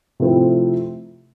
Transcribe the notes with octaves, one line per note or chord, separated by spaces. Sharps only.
C3 F3 A3 C4 E4